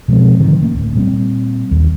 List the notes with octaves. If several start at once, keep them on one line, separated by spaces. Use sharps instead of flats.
B2 F3 G#3 C4
G#2 D3 D#3 F3
A3 A#3 C#4
D1
A#2 G3 C4
D#2